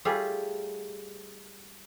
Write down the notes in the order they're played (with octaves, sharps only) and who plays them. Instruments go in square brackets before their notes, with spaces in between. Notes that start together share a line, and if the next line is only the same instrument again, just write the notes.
[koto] G3 A3 F4 G#4